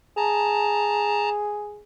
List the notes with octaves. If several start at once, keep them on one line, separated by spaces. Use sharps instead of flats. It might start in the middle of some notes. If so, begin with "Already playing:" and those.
G#4 A5 A#5